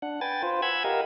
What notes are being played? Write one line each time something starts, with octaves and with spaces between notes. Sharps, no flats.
D4 F#5
B4 G5 G#5 A6
F4 B4 C5
F#5 G#5 B5 E6 G#6
G4 A#4 D#5 F5 F#5